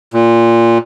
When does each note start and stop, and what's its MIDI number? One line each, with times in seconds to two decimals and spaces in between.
0.14 0.78 46